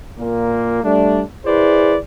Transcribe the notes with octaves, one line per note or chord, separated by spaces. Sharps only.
A#2 A#3
G3 A3 D4
E4 G#4 B4 C5 D5